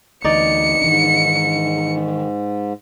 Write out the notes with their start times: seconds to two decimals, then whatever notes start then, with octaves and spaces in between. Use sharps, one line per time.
0.24 D2 E3 D#4 D5 C#7
0.82 G#2 D#3 E3 D4